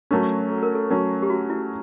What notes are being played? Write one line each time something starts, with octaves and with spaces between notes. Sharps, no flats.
F#3 A3 C#4 A#4
A4
A#4
A4
F#3 A3 C#4 A#4
G4
F#4
E4